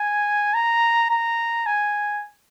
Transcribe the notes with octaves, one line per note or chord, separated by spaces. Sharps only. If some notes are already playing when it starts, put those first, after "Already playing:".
Already playing: G#5
A#5
A#5
G#5